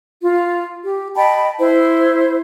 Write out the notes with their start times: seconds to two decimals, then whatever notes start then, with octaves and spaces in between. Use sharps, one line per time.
0.22 F4
0.83 G4
1.16 D#5 G5 A5 B5
1.59 E4 C5